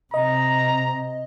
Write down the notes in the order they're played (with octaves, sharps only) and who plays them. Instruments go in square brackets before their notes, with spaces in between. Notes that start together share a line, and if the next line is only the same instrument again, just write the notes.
[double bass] C3 [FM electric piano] D#5 [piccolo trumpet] A#5